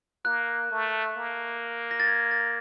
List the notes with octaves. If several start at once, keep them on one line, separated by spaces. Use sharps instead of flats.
A#3 F#6
A3
A#3
A#6
A6
G#6
A6